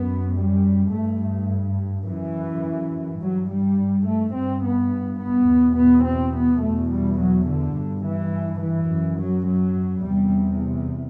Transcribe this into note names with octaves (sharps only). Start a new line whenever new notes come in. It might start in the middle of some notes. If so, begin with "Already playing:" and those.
Already playing: F#2 B3
G3
G2 A3
F#2 E3
G2 F#3
G3
A3
G2 C4
B3
B3
E2 B2
B3
C4
B3
E2 B2 A3
G3
F#3
D3
G2
E3
E3
F#2
F#3
F#3
E2 C3 G3